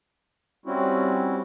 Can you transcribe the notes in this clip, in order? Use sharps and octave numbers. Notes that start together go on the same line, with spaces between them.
G3 C4 C#4 E4 F#4